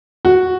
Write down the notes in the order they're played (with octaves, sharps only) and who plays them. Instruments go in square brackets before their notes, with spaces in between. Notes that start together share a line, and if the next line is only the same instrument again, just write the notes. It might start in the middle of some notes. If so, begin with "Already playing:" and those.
[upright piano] F#4